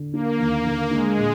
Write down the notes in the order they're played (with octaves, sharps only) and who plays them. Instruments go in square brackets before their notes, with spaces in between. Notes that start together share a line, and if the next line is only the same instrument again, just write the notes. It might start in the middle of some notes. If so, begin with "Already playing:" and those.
Already playing: [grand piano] D3
[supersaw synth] A#3 [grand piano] D4
[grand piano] D#2
D3
[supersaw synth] G#3 [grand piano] D4
[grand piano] A#2